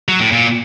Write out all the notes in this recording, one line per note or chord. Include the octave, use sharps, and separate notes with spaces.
F#3
A2
A#2